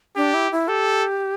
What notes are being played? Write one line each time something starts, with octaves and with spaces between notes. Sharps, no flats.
D4 G4
E4
E4
G4 A4